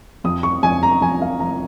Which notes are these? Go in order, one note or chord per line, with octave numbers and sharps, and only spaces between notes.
F2 D#6
C#6
F2 G#5
A#5
F3 G#5
F5
F3 A#5